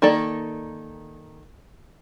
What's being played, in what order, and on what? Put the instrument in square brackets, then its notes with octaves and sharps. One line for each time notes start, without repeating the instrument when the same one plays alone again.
[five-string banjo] D#3 A#3 A4 D5